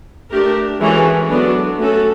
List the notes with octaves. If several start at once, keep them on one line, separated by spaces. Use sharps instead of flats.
A3 D4 G4 A#4
E3 G#3 C#4 F#4 A4
F#3 B3 D4 F#4 A4
A3 C#4 F#4 A4